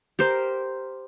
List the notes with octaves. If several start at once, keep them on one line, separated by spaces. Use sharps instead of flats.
G4 A#4 C5